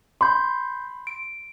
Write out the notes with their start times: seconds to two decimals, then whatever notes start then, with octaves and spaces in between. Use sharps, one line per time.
0.21 B5 C6 G6
1.07 D7